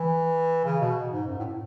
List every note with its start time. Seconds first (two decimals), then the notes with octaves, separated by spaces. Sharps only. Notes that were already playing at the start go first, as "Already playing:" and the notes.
Already playing: E3
0.65 C#3
0.80 B2
1.11 G#2
1.27 F#2
1.38 A2